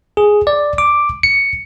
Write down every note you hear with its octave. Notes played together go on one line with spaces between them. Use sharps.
G#4
D5
D6
C#7